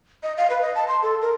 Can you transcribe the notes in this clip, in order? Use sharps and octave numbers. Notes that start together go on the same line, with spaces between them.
D#5
F5
B4
D#5
A5
C6
A4
A#4